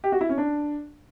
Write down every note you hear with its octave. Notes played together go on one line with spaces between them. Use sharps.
G4
F#4
E4
C#4
D4